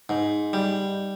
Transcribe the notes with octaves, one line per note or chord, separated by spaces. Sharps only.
G#2
G3